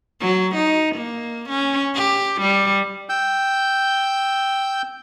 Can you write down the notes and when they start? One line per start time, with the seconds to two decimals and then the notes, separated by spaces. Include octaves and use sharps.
0.20 F#3
0.55 D#4
0.95 A#3
1.49 C#4
1.95 G4
2.41 G3
3.09 G5 E6 G6